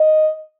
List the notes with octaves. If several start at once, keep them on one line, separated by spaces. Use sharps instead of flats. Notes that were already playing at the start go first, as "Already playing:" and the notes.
Already playing: D#5